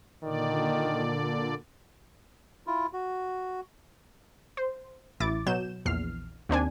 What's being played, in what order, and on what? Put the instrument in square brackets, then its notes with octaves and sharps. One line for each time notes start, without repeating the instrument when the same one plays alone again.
[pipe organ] A#2 D3 D5 [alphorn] D#3
[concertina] E4 F4
F#4
[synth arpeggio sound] C5
A1 E4 D6 A6
B2 F#3 G6 E7
A#1 E2 F6 C7
D#2 C4 D4 G#5